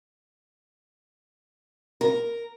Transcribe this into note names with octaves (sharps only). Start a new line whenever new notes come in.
A#4